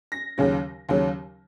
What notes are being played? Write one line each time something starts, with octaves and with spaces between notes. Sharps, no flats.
A#6
D#2 C#3 F#3
D#2 C#3 F#3